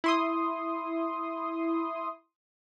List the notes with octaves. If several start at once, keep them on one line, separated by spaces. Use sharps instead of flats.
E4 C6 D#6